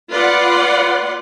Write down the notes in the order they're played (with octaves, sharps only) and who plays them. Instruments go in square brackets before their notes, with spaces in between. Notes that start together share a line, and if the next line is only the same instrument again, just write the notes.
[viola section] F4 B4 D5 F#5 C6